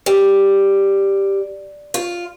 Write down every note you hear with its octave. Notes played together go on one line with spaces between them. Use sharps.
G3
F4